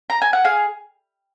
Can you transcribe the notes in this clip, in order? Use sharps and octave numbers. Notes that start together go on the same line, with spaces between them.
A#5
G#5
F#5
G#4 F5